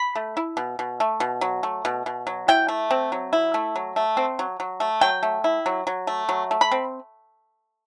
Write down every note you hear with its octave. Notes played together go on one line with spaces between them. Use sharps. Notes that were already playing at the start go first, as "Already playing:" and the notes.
Already playing: B5
A3
E4
B2
B2
A3
B2
F#3
A3
B2
B2
F#3
E4 G5
A3
C4
F#3
E4
A3
F#3
A3
C4
F#3
F#3
A3
F#3 G5
A3
E4
F#3
F#3
A3
F#3
A3
B5
C4